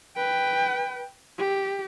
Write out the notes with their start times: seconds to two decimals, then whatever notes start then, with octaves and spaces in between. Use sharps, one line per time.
0.16 B4 G5
1.38 G4